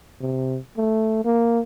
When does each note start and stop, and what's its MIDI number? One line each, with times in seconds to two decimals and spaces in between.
0.21 0.59 48
0.77 1.23 57
1.25 1.60 58